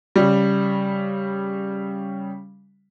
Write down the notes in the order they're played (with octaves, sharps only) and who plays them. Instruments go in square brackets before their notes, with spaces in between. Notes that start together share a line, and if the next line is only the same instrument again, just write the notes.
[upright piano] C#3 G3